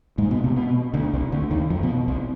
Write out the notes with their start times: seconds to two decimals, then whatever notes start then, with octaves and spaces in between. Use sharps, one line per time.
0.18 G#2 G#3
0.31 B2 B3
0.44 C3 C4
0.56 B2 B3
0.94 D2 D3
1.13 C2 C3
1.32 D2 D3
1.51 D#2 D#3
1.70 F2 F3
1.83 B2 B3
2.08 C2 C3